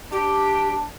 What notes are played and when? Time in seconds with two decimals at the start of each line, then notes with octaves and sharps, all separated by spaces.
0.12 D4 G4